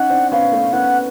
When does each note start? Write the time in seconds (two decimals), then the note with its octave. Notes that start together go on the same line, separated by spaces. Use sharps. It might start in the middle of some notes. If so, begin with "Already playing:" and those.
Already playing: C#4 D#4 F#5
0.10 C4 D4
0.32 B3 C#4 F5
0.51 A3 B3
0.73 B3 C#4 F#5